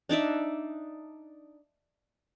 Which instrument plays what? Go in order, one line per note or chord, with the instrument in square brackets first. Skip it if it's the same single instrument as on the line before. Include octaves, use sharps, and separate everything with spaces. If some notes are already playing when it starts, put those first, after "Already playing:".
[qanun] D4 D#4 D5 E5